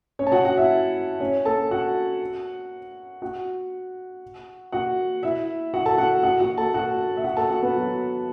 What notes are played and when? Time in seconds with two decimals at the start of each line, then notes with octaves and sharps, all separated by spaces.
0.19 C#4 C#5
0.27 A5
0.32 F#4 F#5
0.45 F#4 F#5
0.57 E4 E5
1.20 C#4 C#5
1.45 A4 A5
1.71 F#4 F#5
3.22 F#4 F#5
4.72 F#4 F#5
5.23 E4 E5
5.74 F#4 F#5
5.86 A4 A5
5.98 F#4 F#5
6.23 F#4 F#5
6.40 F#4 F#5
6.58 A4 A5
6.74 F#4 F#5
7.17 E5
7.24 F#4 F#5
7.37 A4 A5
7.50 F#4 F#5
7.62 B3 B4
7.75 F#3 F#4